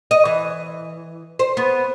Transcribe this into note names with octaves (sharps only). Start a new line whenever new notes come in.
D#5
E3
C5
B3